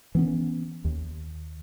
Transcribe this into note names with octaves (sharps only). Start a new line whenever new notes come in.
E3 B3 C#4
D#2